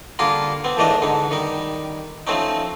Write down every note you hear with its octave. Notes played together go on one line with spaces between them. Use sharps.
D3 G3 A#3 F4 G#4 A#4
B3 C4
D#2 G#2 E3 A3 D4 D#5
G#2 D3 D#4
D#3 G3 D#4
F3 A3 C4 C#4 D#4